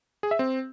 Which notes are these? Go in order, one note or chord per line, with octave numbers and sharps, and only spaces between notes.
G#4
E5
C4